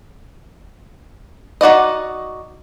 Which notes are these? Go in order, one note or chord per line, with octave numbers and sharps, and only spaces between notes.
D#4 F#4 D5 D#5